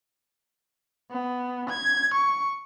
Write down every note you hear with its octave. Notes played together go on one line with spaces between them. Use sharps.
B3
G#6
C#6